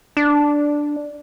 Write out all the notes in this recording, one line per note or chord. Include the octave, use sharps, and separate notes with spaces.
D4